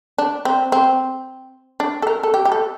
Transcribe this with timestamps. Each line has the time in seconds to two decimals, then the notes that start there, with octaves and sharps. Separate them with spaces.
0.18 D4
0.45 C4
0.72 C4
1.80 D4
2.02 A4
2.07 A#4
2.23 A4
2.34 G4
2.45 G4
2.52 A4